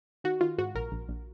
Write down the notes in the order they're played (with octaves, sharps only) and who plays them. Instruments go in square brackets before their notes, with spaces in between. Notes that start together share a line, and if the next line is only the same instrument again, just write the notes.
[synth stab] D#3 F#4
D#3 F4
G#2 F#4
A#1 A#4
A#1
A#1